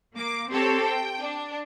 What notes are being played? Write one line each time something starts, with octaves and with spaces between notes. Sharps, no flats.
A#3 D6
C4 G4 A4 C#5
G5
D4